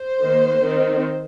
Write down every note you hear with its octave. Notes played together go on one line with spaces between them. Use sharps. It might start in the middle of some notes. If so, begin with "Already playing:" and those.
Already playing: C5
D#3 A#3
D#3 C4